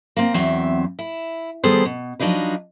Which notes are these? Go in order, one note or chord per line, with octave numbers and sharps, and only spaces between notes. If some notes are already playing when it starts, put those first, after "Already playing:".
A#3 C4
E2 F#3 C4 E5
E4
D#3 G3 B3 G#4 A4 C5
B2
F3 F#3 D4 D#4 B4